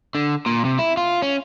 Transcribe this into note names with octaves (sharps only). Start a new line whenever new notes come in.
D3
A#2
C3
E4
F4
C#4